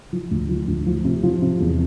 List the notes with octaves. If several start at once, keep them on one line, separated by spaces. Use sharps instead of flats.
F3
D2
F3
D2
F3
C3
F3
C3
E2